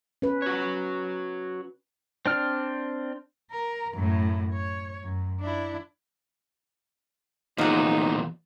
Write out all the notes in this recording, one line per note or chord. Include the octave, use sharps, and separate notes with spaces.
C#4 B4
F#4 C#5
C4 D4 F6
A#4
F#2 A2
C#5
F#2
D4 E4
E2 A#2 F3 F#3 D#4